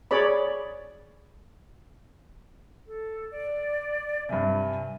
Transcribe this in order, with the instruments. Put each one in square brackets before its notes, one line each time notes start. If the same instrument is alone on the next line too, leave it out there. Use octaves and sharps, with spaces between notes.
[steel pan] G#4 C#5 D5 B5
[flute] A4
D5
[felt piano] G2 C3 [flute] G#5